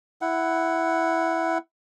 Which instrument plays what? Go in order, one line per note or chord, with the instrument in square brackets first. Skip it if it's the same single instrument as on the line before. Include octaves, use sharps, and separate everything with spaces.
[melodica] E4 F#5